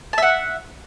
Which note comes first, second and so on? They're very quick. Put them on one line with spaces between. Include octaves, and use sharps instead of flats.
A5 E5 F#5